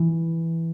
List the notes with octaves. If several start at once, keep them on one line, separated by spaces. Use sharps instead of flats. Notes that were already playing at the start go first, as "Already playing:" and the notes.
Already playing: E3